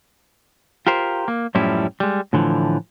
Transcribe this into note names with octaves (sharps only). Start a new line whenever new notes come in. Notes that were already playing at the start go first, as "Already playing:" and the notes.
F4 G4 A#4 C5
A#3
F#2 A2 F3 G3 C#4 E4
G3 G#3
A2 D3 E3 F3